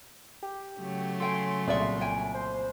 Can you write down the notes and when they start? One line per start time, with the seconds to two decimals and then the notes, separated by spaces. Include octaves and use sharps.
0.43 G4
0.78 C#3 F#3 A3
1.20 A4 G5 G#5 C6
1.67 C2 A#2 G#4 D5 E5
2.01 G5 G#5
2.34 C5